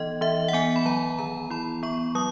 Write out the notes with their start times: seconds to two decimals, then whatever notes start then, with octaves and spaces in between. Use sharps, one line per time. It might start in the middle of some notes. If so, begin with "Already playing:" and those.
Already playing: E3 B3 D#4 D#5
0.21 E3 E5
0.48 F#5
0.53 B3 G#5
0.76 B5
0.86 F#3 A#5
1.19 D#3 A#5
1.50 E4 B5
1.83 B3 C#6
2.15 F#3 D#6